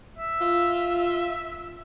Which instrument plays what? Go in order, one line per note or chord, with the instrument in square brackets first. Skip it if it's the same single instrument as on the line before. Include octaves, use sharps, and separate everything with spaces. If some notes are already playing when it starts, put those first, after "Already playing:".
[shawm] E5
[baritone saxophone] F4